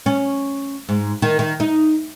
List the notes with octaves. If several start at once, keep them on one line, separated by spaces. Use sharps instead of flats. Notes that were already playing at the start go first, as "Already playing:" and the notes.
C#4
G#2
D#3
D#3
D#4